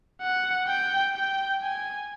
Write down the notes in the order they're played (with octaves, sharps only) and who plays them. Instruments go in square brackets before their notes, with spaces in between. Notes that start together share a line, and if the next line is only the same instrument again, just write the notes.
[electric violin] F#5
G5
G5
G#5